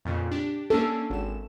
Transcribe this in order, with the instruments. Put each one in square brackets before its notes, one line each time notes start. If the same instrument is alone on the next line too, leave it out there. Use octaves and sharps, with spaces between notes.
[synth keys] F2 A#2 C#3
D4 G4
[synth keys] A#3 C#4 D4 [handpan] A4
[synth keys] G#1 E7